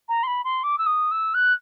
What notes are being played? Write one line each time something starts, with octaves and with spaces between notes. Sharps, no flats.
A#5
C6
B5
C6
D6
E6
D#6
E6
F#6